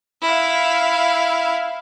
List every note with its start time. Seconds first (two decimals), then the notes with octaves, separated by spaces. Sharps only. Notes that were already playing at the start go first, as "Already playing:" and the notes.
0.21 E4 F5